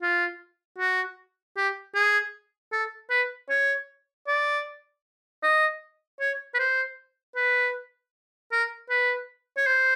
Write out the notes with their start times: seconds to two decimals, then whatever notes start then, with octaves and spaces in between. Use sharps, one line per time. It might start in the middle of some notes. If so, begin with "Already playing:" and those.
0.02 F4
0.79 F#4
1.57 G4
1.95 G#4
2.72 A4
3.10 B4
3.50 C#5
4.27 D5
5.43 D#5
6.20 C#5
6.54 B4
6.59 C5
7.36 B4
8.52 A#4
8.90 B4
9.57 C#5
9.67 C5